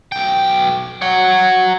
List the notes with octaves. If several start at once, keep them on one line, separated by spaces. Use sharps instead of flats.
B1 G5
C#5 F#5